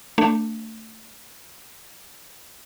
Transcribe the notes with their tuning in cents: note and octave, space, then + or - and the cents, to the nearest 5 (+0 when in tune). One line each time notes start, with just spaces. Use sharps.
A3 +20 D4 +0